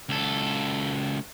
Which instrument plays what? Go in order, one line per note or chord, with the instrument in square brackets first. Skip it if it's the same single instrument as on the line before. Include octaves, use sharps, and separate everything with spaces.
[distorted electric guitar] C#2 A4